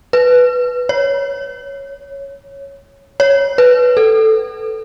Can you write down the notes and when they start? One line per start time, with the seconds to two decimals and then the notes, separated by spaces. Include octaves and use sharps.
0.13 B4
0.89 C#5
3.20 C#5
3.58 B4
3.97 A4